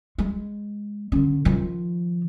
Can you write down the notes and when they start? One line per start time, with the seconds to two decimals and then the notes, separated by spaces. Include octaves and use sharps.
0.18 G#3
1.12 D3 C#4
1.45 D#3 F3